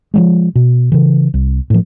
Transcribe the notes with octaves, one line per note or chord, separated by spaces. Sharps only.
F3 F#3 G#3
B2
C#3 E3
C2
A2 F3